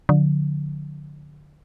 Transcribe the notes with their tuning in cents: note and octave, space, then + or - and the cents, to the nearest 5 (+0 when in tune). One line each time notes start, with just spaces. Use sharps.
D3 +0 F3 +45